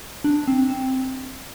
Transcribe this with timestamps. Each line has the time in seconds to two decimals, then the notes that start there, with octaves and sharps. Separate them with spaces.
0.24 D4
0.48 C4
0.70 C4